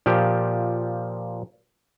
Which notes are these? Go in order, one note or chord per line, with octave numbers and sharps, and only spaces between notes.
A#2 F3 G4